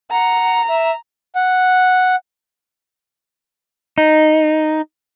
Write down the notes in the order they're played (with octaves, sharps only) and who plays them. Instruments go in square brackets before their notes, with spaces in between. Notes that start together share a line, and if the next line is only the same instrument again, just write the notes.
[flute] F#5 [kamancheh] A#5
[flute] E5
[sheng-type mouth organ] F#5
[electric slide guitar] D#4